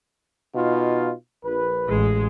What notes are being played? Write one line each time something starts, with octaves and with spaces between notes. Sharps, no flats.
B2 D#4 F4
A#1 B4
A1 G#3